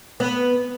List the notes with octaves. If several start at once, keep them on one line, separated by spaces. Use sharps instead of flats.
B3